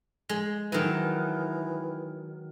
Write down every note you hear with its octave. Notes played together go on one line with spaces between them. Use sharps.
G#3
D#3 E3 F#3